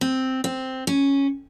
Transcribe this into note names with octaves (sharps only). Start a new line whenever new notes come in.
C4
C4
C#4